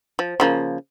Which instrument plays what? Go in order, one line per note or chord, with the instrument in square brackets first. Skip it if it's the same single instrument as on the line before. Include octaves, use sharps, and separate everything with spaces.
[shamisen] F3
C#3 F3 A#3